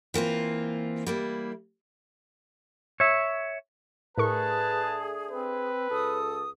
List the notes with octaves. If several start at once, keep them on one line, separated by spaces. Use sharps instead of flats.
E3 A#3 C4 F4
G3 A#3 E4
C#5 E5
A2 A3 D4 G#4 A#4 B4 A5 C#6
C4 B4
C#2 A4 D#6